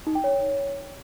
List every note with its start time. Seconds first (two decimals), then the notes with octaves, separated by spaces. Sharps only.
0.07 D#4
0.15 G5
0.24 C#5